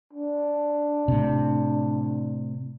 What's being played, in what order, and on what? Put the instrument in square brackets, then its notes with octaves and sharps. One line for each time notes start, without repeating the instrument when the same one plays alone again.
[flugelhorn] D4
[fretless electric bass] A2 C3